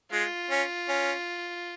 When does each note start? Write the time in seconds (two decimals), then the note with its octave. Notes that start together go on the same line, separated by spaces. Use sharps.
0.11 G#3 F4
0.50 C#4
0.89 C#4